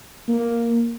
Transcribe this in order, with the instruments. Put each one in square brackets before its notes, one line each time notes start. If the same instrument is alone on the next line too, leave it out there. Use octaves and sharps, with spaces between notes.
[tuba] A#3